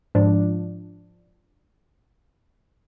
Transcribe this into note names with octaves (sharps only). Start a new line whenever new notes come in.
G#2 F3 D4